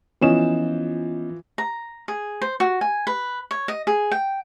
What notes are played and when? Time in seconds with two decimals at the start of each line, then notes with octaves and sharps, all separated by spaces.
0.21 E3 F3 B3 C#4 D#5 E7
1.58 A#5
2.08 G#4
2.42 C5
2.60 F#4
2.81 G#5
3.07 B4
3.51 C#5
3.68 D#5
3.87 G#4
4.11 G5